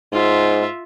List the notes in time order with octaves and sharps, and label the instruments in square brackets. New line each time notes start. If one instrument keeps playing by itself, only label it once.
[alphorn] G#2 [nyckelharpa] F4 E5